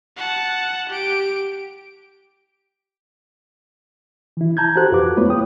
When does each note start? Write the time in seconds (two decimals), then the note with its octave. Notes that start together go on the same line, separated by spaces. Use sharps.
0.17 F#5 A5
0.89 G4 D7
4.37 E3 E4
4.57 A5 A#5 G6 G#6
4.76 F#4 G4 A4 C5 F#6
4.92 F2 F4 F#4 B4 D6
5.16 G#3 A3 B3 E4 B4 C#5
5.29 G#3 G5 D#6